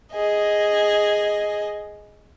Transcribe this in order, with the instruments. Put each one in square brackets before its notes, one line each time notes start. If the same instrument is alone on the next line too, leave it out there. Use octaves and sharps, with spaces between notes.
[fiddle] G#4 D#5